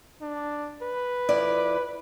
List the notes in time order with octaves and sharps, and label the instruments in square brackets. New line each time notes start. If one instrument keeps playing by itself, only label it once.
[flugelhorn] D4
B4
[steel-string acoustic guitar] F2 E4 D5